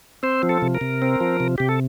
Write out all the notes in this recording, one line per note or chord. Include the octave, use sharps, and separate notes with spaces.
C4 C5
F3
A4
C3
A#4
C3
C4
F3
C3
C3 G4
A4